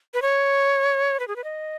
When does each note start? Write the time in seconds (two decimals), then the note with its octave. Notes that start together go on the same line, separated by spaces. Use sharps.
0.14 B4
0.22 C#5
1.20 B4
1.28 G#4
1.36 B4
1.44 D#5